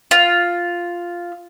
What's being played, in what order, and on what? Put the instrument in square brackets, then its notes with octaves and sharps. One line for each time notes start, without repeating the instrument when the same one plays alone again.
[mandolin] F4